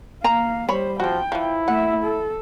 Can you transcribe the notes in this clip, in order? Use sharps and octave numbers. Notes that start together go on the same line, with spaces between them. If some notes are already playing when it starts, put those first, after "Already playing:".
A#3 F5 A#5
G3 C5 C#5 B5
F3 C4 F#4 G5
E3 F3 E4
A3 E5 F#5
A4